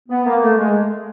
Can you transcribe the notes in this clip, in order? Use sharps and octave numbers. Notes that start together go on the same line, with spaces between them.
B3
A#3
A3
G#3